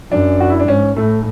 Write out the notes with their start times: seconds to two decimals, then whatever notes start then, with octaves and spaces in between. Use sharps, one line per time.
0.11 F#2 D4
0.40 F#4
0.50 E4
0.60 D4
0.68 G#2 C#4
0.97 A2 A3